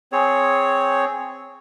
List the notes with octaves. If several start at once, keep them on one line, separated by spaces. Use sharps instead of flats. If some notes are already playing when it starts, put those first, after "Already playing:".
C4 G#4 C#5